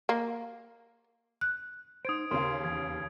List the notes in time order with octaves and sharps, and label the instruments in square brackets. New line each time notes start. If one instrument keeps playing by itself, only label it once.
[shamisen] A#3
[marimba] F#6
[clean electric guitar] D#4 C5 [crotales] D#6 G#6 D7
[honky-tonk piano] D#2 C#3 F5 [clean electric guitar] A#4 C6
[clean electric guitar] E2 [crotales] G#6